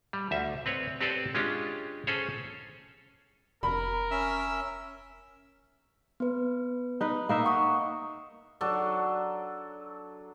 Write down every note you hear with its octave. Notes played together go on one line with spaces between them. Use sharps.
G3
D2 E5
C4 B4 C#5
C4 G4 A4 B4 C5 D5
G#3 C#4 D4 F4 G4
C#4 G#4 A4 C5 C#5
F1 A#4 B5
C#4 E5 E6
B3 B4
D#4 B4
A#3 D#4 E5
F#5 C#6 D#6
F#3 D4 A4